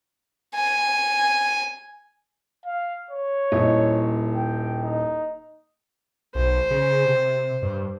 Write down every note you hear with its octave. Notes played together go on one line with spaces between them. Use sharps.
G#5
F5
C#5
D#1 E4 D#5
G5
D#4
B1 C5
C#3
C3
G2